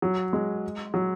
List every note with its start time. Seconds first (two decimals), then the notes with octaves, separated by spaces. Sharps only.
0.02 F#3
0.33 G#3
0.94 F#3